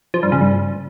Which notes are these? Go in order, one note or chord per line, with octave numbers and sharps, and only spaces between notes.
F3
G2
C#3
G2